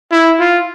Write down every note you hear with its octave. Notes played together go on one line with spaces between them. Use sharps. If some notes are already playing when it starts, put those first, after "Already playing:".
E4
F4